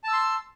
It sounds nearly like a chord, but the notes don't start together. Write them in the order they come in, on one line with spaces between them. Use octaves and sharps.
A5 E6 C6